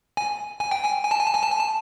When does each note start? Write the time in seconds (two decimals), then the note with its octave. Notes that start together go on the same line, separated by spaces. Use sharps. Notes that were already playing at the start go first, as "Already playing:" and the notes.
0.17 G#5
0.60 G#5
0.71 G5
0.84 G#5
1.04 G#5
1.11 A5
1.19 G#5
1.26 A5
1.35 G#5
1.43 A5
1.51 G#5
1.59 A5